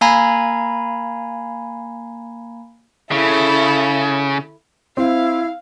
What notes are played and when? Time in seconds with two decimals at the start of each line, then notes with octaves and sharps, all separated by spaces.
0.01 A#3 F5 G#5 A#5 B5 G#6
3.11 C#3 E4 A4
4.97 C4 E4 F5